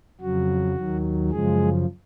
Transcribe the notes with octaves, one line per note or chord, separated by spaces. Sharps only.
F2 C#3 F#3 F#4
D#2 D#3 F#3
F#2 C#3 F3 G#3 G#4